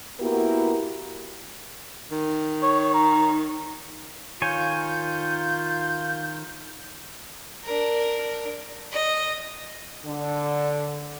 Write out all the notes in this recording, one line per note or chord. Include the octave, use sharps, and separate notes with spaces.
A#3 B3 E4 F#4 G4 A#4
D#3
C#5
A#5
D#3 F4 C#5 G#5 G6
D4 A#4
D#5
D3